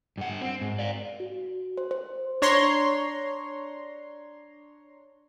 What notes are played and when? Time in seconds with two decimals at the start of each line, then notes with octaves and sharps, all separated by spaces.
0.18 G2 F#5
0.41 C4
0.61 G#2
0.79 D5 F5
1.20 F#4
1.78 C5
1.91 C5
2.42 D4 C#5 A#5 C6